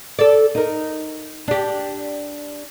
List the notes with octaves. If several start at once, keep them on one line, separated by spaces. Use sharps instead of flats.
A4 D5
D#4 A#4
D4 G4